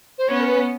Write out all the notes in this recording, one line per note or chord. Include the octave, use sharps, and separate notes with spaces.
C5
B3 C#4 C#5
A#4
B4